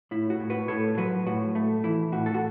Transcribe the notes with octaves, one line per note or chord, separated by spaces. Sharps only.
A2 E4
F#4
A2
F#4 B4
A2 A4 C#5
F#3 F#4 B4
A2 F#4
A3
E3 E4
A2 F#4
A4
F#4